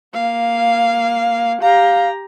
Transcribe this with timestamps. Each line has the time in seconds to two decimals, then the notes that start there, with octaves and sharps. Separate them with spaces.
0.14 A#3 F5
1.62 G4 F5 A#5